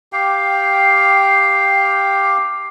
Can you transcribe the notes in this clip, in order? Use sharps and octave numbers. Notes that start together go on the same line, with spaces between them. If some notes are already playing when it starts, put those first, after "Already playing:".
G4 F5 G5